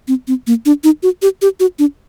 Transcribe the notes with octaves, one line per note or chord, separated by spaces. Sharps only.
C4
C4
A#3
D4
D#4
F#4
G4
G4
F#4
D4